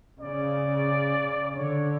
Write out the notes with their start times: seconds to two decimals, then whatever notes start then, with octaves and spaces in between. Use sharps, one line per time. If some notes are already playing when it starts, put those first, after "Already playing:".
0.20 C#3 D5
1.55 D3 C#5